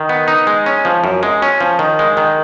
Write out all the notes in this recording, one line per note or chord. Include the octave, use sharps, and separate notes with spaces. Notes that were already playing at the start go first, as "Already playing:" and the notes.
Already playing: D#3
B3
D#4
G#3
C#4
F3
F#2
G#3
C#4
F3
D#3
G#3
D#3